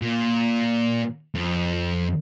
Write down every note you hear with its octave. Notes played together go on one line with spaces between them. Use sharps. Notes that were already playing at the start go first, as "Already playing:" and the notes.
A#2
F2